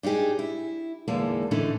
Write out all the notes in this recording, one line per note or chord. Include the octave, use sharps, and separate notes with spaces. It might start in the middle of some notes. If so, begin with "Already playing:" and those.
D4 D#4 F4 G4 G#4
E4
E2 D3 G#3 A#3 D#4 A5
A2 D3 E3 A3 C#4 D#4